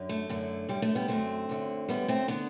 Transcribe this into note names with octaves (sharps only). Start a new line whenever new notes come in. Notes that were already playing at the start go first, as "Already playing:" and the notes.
Already playing: F#2 D3
A3
F#2 D3
F#2 D3 G3
A3
G3 B3
F#2 D3 A3 C4
F#2 D3
F#2 D3 G3 B3
A3 C4
D3 B3 D4